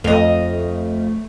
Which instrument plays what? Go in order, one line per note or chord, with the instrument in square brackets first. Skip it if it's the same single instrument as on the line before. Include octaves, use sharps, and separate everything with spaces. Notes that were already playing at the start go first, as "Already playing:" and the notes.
[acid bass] F2 [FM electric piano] A3 [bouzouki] D#5 F5